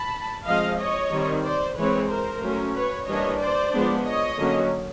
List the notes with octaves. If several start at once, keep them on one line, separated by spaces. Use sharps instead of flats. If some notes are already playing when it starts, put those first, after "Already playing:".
Already playing: A5 B5
F3 G#3 C4 D#5 F5
C#5 D#5
D#3 G3 C4
C5 D5
E3 G#3 C4 B4 C#5
A#4 C5
F#3 A3 C#4
B4 C#5
E3 G3 A#3 D4 C#5 D#5
C5 D5
F3 G#3 B3 D4
C#5 D#5
D3 F#3 A#3 C#4